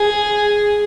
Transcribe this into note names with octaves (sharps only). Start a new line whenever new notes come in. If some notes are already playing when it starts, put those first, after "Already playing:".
Already playing: G#4